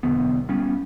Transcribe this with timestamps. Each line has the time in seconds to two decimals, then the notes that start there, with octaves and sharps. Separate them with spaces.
0.03 B1 E2 D3 B3
0.49 G3 B3 C#4